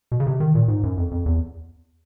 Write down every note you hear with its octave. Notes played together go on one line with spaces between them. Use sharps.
B2
C#3
C3
D#3
A#2
G#2
F#2
F2
F2
E2